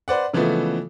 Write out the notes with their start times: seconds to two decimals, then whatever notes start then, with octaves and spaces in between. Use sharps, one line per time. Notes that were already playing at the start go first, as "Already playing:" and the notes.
0.08 B4 C5 D5 F#5
0.33 C#3 E3 F3 G#3 A3 B3